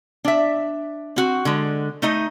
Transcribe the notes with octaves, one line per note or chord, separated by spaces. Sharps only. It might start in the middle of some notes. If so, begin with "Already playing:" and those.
D4 E5
C4 F#4
D3 G#3
A3 D#4 D#5